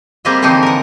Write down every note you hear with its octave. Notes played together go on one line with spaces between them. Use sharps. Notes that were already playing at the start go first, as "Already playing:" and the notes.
G3 A#3 C4 G#4 D#5 E5
D3 E3 F3 C4 D#4
A#4 F#5